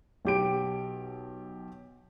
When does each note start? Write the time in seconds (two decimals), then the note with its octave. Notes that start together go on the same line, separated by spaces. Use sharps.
0.25 B1 G4 D7